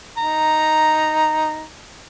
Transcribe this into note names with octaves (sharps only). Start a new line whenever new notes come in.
D#4 A#5